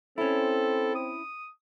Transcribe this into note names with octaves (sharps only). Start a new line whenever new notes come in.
C4 C#4 E4 A4
D#6